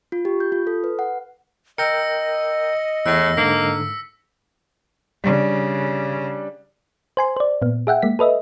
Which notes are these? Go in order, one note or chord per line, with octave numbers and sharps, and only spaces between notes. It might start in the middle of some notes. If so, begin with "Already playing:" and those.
F4
G4
G6
F4
A4
B4
F#5
A#4 D#5 G5 E6 G6 A#6 C#7
E2 A2 E6 A#6
G#2 D3 A#3 B6
C#3 G3 D4
C5 G#5 C6
C5 D5
A#2 B3
G#4 E5 F#5 G5
G#3 A#3 B6
A4 B4 D#5 E5